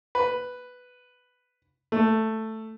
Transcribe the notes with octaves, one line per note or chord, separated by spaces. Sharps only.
B4
A3